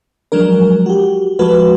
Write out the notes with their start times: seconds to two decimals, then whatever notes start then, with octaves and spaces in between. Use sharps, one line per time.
0.32 F3 F#3 G#3 D4 A#4
0.86 F#4 G4
1.39 F3 G#3 F#4 A4 B4